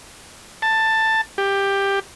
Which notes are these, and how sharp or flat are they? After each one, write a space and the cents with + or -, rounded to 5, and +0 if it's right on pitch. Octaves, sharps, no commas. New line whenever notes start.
A5 +10
G4 +10